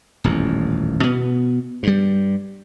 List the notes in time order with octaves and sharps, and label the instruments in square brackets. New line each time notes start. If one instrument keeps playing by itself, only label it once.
[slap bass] D#1 A1 F2
B2 B3
G2 G3